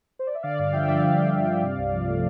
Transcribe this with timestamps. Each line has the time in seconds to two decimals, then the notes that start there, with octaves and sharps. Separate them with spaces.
0.19 C5
0.27 D5
0.35 E5
0.43 D3 D5 F5
0.59 G2 D5 F5
0.73 F3 E5 G5
0.88 G2 D5 F5
1.02 D3 D5 F5
1.18 G2
1.32 F3
1.47 G2
1.63 C3
1.77 C2
1.93 F3
2.08 A3